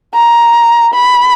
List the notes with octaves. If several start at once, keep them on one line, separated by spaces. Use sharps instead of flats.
A#5
B5